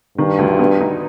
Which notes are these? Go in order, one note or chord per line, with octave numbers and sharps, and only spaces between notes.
G2 D#3
D2
B3
D#4